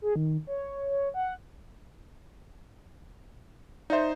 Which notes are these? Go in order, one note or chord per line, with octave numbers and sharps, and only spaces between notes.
G#4
D#3
C#5
C#5
F#5
D#4 C5 D5 E5